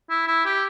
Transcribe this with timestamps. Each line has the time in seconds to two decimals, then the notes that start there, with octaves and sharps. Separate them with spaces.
0.10 E4
0.27 E4
0.45 G4